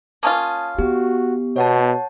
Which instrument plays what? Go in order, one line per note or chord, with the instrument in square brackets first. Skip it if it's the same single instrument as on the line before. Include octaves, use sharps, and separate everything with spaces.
[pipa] A#3 C#4 F4 [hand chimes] A5 D#6 G#6
[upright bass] B3 [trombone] F#4 [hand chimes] G4
[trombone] B2 [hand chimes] C#5 F#5 A5